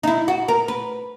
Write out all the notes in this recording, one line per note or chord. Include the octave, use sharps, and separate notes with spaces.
D#4
E4
F#4
A#4
B4